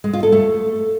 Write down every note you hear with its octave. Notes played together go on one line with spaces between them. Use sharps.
G#3
F4
A4
A3